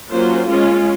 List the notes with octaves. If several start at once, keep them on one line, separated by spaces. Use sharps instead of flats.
F#3 A#3 C#4 F4 C5
G#3 C#4 F4